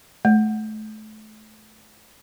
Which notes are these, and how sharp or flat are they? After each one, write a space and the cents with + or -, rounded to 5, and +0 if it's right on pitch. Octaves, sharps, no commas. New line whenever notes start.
A3 -30